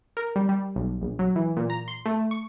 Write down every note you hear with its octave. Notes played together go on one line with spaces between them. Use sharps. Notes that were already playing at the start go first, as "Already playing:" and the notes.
A#4
G3
G3
B1
A#1
F#3
E3
A#2
A#5
C6
A3
C#6